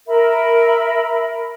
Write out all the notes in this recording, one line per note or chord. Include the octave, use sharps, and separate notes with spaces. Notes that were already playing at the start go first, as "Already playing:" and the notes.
A#4 E5 B5